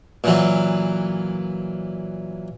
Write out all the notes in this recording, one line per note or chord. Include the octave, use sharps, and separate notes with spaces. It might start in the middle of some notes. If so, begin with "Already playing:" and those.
A#2 E3 F#3